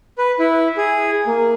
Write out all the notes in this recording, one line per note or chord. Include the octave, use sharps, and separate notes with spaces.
B4
E4
G#4
A#3